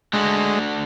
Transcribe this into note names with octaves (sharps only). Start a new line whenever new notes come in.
G#3 A3 D4 F#4